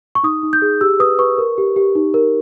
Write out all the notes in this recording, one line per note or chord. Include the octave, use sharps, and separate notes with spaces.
C#6
D#4 D#6
D#4
G6
G#4
G4 E6
B4 D#6
B4 C#6
A#4
G4
G4
D#4
A#4